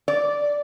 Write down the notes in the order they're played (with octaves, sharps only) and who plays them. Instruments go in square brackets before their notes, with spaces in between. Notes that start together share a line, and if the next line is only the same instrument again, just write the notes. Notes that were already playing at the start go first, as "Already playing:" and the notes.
[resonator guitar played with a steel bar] D5